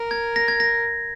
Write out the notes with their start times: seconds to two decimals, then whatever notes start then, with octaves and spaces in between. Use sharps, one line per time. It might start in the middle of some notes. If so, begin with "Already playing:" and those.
Already playing: A#4
0.11 G#6
0.36 A#6
0.48 G#6
0.60 A#6